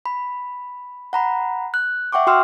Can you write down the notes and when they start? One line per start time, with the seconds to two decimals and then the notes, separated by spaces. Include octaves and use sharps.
0.06 B5
1.13 F#5 A#5 B5
1.74 F#6
2.13 E5 F#5 G5 C#6 D6
2.27 F#4 G5 C6 E6 F6